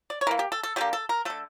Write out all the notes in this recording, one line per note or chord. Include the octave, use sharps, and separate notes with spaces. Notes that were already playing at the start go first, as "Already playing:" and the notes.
D5
C#5
E3 A#3 A#4
G4
A4
A4
D3 G3 A#3 G4
A4
A#4
D3 A3 A4